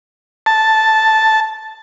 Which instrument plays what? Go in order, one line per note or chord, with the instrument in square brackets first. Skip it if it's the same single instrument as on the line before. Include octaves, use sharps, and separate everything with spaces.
[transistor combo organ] A5